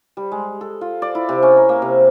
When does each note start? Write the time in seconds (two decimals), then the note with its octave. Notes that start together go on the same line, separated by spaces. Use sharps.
0.17 G3
0.32 G#3
0.61 A4
0.81 F4
1.02 D5
1.15 E4
1.29 C3
1.43 C#4
1.57 A#4
1.69 A#3
1.82 C3